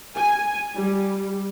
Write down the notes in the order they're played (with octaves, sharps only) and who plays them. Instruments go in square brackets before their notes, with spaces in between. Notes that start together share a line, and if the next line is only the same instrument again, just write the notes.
[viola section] G#5
G3